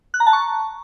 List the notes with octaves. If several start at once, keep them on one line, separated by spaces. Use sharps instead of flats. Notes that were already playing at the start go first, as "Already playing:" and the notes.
F#6
A#5
A5
C#6